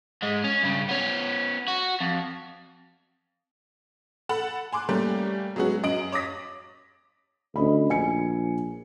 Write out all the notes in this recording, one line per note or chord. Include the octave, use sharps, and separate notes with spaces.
G#2 G#3
C#4
G2 C#3
B3 C#4
F#4
F2
A4 F#5 B5
G#5 C6 D6 F#6
G3 A3 A#3 C#4 G4
F#3 G#3 B3 C#4 F#4
F#2 D#5 D7 F#7
C#5 D6 D#6 A#6 B6
D2 C#4 D#5 B5
A#1 G#5 C#7